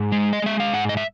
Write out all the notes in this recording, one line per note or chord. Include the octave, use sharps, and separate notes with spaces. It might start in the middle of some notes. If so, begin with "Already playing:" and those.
Already playing: G#2
G#3
D#5
G#3 E5
F5
G#2 F#5
D#5
E5